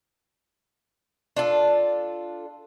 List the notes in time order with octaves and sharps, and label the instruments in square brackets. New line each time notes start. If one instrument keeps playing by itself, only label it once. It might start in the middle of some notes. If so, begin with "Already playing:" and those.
[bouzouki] D4 F4 A4